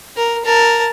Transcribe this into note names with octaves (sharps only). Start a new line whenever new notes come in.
A#4
A#4 A5